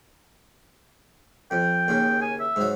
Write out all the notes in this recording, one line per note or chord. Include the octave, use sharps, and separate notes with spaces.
F2 G5
D#2 C#3
G#5
E5
G#2 F#3